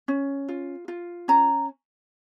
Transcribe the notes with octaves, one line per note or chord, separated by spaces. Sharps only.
C#4
F4
F4
C#4 A#5